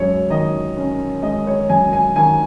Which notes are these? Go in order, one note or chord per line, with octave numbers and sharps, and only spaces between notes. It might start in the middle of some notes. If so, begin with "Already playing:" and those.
Already playing: F#2 G#3 C#5
D#3 D#5
C#4
G#3 D#5
C#5
F#2 G#5
G#5
D#3 G#5